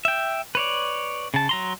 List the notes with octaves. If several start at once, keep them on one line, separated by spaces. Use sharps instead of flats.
E5 G5
B4 C#5 D5
C#3 A5
F#3 A#5 C6